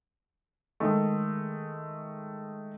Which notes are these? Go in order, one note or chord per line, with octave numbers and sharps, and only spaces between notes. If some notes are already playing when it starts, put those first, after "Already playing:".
D#3 G#3 A3